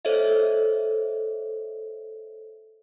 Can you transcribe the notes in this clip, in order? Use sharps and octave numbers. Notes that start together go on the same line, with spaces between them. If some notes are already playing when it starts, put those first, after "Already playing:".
A4 C5 C#5 D#5 E5